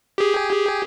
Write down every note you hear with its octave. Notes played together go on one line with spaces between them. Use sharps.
G4 G#4